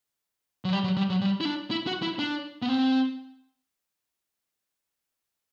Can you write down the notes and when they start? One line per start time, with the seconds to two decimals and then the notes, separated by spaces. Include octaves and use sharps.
0.65 F#3
0.73 G3
0.84 F#3
0.97 G3
1.10 F#3
1.21 G3
1.41 E4
1.45 D4
1.71 E4
1.87 F#4
2.02 E4
2.19 D4
2.62 B3
2.69 C4